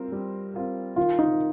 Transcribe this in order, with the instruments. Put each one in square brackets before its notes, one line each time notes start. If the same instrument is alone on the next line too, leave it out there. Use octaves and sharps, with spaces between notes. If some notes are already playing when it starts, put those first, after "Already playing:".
Already playing: [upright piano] G3 C4 F4 A#4
G3
C4 F4 A#4
[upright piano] D#3 [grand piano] F4
[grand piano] D#4